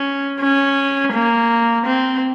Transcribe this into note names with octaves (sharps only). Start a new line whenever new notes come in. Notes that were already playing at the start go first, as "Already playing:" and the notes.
Already playing: C#4
C#4
A#3
C4